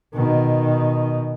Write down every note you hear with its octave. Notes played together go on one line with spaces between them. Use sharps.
B2 D#3